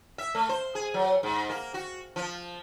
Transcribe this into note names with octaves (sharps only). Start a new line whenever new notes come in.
E5
A3
C5
G#4
F#3
G#2
A#3
F#4
F3